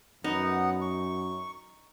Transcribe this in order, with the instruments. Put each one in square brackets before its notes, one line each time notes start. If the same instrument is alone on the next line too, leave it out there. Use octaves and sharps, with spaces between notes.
[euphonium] F#2 [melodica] B3 F#5 [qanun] D#4
[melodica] C#6